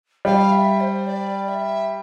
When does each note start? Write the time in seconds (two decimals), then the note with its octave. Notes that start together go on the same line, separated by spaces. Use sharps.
0.25 G3 F5
0.52 E5
0.81 C5
1.07 D5
1.48 E5